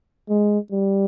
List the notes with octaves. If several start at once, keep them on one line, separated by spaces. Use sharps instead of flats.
G#3
G3